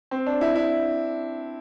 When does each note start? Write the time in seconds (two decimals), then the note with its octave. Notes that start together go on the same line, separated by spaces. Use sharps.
0.11 C4
0.26 D4
0.41 E4
0.55 E4